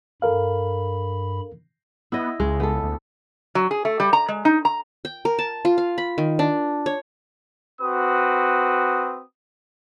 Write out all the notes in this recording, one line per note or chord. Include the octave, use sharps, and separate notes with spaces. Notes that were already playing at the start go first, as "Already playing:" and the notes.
G2 A4 A#4 F5 B5
B3 E4 D#5
C#2 G#3
B3 A4
D2
F#3
G#4
A3
G3
A#5
G#3
D#4
A#5
G5
A#4
A5
F4
F5
B5
D#3
D4
C#5
C4 F#4 B4 D#6